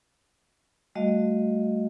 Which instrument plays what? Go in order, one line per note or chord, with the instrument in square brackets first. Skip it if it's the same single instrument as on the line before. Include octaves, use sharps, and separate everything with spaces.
[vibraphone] G3 A3 F#4 D#5 F5